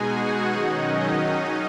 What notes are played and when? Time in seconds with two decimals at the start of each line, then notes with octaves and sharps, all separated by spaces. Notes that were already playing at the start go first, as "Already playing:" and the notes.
Already playing: B2 G#3 D#4 F#4 G#4 F#5 G#5
0.47 D#3 F#3 C#4 D#4 D#5